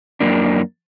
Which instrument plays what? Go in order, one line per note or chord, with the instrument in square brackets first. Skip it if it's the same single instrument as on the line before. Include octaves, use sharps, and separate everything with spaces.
[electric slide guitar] F#2 A#3 D4